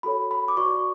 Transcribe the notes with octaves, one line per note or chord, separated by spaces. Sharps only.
F#4 A4 C#5 B5
B5
D6
F#4 B4 D5 C#6